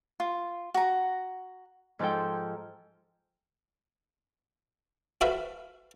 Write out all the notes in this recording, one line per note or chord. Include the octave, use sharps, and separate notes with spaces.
F4
F#4 A#5
G#2 F3 G#3 A4 G5
F#4 A4 B4 C5 E5 F5